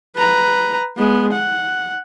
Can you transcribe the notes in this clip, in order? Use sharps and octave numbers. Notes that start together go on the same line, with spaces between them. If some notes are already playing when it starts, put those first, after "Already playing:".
B4 A#5
G#3 B3
F#5